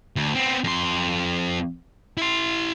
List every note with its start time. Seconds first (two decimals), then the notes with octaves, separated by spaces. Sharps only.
0.16 D2
0.35 B3 C4
0.64 F2 C6
2.18 E4 C6